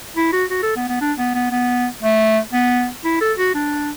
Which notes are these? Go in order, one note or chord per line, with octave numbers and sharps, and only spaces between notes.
E4
F#4
F#4
A4
B3
B3
D4
B3
B3
B3
A3
B3
E4
A4
F#4
D4